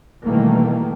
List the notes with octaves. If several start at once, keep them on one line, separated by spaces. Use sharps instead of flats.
B2 D#3 E3 G3 A3 A#3